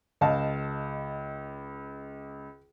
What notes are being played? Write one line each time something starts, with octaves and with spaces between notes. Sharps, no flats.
C#2 D#5 F5 A5